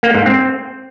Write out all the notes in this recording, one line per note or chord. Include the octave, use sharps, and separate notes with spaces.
A#3
G#2
C4